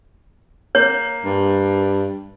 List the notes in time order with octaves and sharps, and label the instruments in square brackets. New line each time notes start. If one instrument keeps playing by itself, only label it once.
[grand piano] A#3 [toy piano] C#5
[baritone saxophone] G2